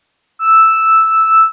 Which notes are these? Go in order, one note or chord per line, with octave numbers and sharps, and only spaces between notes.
E6